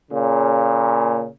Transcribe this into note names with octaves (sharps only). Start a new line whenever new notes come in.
A#2 C#3